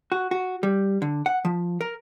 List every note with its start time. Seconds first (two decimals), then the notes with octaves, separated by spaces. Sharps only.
0.12 F#4
0.31 F#4
0.63 G3
1.02 D3
1.26 F#5
1.45 F3
1.81 A#4